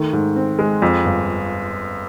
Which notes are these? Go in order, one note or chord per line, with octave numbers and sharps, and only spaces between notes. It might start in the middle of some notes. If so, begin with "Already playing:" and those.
Already playing: D#3 A3
G#2
C4
G#3
F2
G1